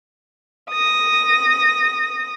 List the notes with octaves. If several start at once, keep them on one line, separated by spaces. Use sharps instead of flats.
D#6 A#6